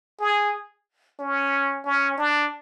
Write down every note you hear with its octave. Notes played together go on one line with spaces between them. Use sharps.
G#4
C#4
C#4
D4